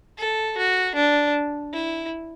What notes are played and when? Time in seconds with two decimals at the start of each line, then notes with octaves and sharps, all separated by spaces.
0.18 A4
0.58 F#4
0.95 D4
1.73 E4